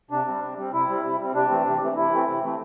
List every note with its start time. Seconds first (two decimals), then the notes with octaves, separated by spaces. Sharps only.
0.10 C3 D4
0.26 G3 C4
0.42 C3
0.57 G3 C4
0.73 C3 E4
0.89 G3 C4
1.04 C3
1.19 G3 C4
1.34 C3 D4
1.50 E3 A3 C4
1.65 C3
1.81 E3 A3 C4
1.96 C3 E4
2.11 E3 A3 C4
2.27 C3
2.42 E3 A3 C4